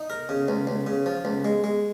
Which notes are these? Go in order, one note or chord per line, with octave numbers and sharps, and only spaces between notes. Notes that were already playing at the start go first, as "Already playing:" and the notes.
Already playing: D#4
A#4
C#3
C#2
C#2
C#3
F3
C#2
G#3
G#3